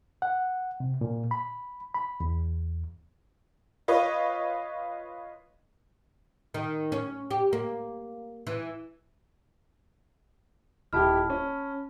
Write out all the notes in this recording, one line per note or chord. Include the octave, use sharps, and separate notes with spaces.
F#5
C3
A#2
B5
B5
E2
F4 B4 C#5 D#5
D#3
C#4
G4
A#3
E3
D#1 E4 G4 A5 B5 F6
C#4